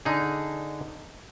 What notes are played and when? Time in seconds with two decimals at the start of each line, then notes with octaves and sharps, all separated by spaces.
0.05 D3 D#4 G#4